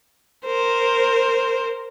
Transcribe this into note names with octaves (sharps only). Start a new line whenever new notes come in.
A#4 C5